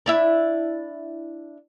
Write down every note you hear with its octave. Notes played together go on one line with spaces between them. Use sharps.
D4 E4 E5